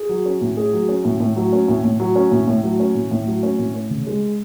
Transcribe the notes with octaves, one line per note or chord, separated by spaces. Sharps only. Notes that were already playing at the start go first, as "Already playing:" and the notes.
Already playing: G#4
F#3
C#4
A2
G#4
F#3
C#4
A2
A2
F#3
C#4
A2
A2
F#3
C#4
A2
A2
F#3
C#4
A2
A2
F#3
C#4
A2
C#4
C#3
G#3